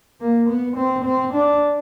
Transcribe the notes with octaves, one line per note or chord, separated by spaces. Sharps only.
A#3
B3
C4
C4
D4